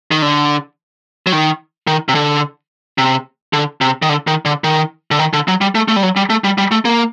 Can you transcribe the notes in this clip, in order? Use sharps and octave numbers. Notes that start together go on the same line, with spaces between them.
D#3
D3
F#3
D#3
D#3
C3
D3
C3
D3
C3
D#3
D3
D#3
D3
D#3
D3
D#3
D3
F#3
G3
A3
A3
G3
F#3
G3
A3
G3
G3
A3
A#3